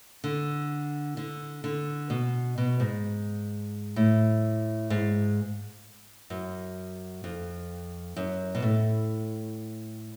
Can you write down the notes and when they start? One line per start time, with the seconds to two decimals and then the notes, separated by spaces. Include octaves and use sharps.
0.24 D3
1.17 D3
1.64 D3
2.10 B2
2.58 B2
2.80 G#2
3.96 A2
4.90 G#2
6.30 F#2
7.24 F2
8.16 F#2
8.55 B2
8.62 A2